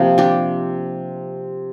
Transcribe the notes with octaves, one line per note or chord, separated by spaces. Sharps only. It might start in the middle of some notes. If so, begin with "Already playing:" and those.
Already playing: C3 F3 A#3
D4 G4